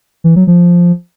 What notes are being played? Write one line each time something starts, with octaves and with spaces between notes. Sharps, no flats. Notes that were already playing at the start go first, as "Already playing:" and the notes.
E3
F#3
F3